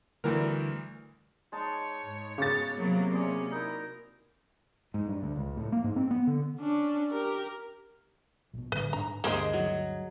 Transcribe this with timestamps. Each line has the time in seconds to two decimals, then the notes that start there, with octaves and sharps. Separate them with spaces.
0.24 D2 D3 E3 G3 A3 A#4
1.52 G#3 D#4 C#5 A5
2.02 G#2
2.38 C#3 B3 F#4 D6 A6
2.76 C3 F#3 A#3 A#4
3.11 C#4 D5 C6 D#6
3.51 D#4 E4 A#4
4.94 G#2
5.08 G2
5.23 D2
5.36 C#2
5.57 A2
5.72 A#3
5.84 G#2
5.96 C4
6.11 B3
6.27 D3
6.59 C#4 D4
7.12 G4 A#4
8.54 A#1 B2
8.72 A2 D3 G3 B4
8.93 G#2 D4 A#5
9.24 D2 G2 G#3 A#3 G4 G#4 C5
9.53 F#3